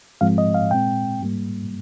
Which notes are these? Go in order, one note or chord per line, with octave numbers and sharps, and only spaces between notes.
G#2 F3 G#3 C4 F5
D#5
F5
A#2 G#3 C4 G5
G#2 G3 A#3